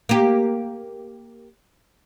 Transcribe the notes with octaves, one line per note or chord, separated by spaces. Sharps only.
A#3 G4